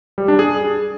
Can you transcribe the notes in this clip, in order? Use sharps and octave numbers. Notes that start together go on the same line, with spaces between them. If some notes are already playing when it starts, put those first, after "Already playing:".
G3
D4
G#4